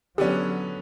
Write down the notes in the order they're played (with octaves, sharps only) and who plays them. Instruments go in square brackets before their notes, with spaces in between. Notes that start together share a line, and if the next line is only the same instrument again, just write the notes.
[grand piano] D3 B3 C#4 [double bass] F#3 [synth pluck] G4 D5